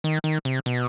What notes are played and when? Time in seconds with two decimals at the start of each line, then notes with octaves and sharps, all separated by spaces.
0.04 D#3
0.24 D#3
0.45 C3
0.66 B2